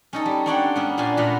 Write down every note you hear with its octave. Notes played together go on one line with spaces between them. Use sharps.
C#4 D#4 A4
G3
C4 D4 C#5 D5 F#5 G5
A#3 B3 C#4
A#2 C#4 D4 C5 G#5 A5
A#2 A3 B3 F#4 B4 A#5